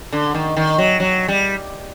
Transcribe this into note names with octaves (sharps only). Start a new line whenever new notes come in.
D3
D#3
D#3
F#3
F#3
G3